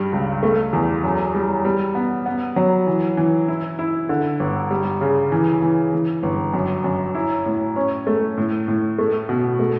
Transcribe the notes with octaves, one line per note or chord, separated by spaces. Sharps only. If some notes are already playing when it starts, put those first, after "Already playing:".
Already playing: G2 G3
C#2
A3
E2
F#2
G3
G3
B3
B3
F#3
E3
E3
E4
E4
D3
G1
G3
C#3
E3
E3
E3
G1
F#2
F#2
E4
A2
C#4
A3
A2
A2
A3
B2
A3